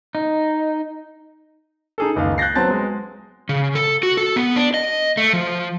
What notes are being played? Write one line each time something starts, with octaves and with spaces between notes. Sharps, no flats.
D#4
D#4 G#4 A4
F#1 C#2 D#3 F5
F#6 G6 A6 A#6 C7
F#3 B3 C4 A5 A6
G#3
C#3
A4
F#4
A4
B3
D4
D#5
A3
F3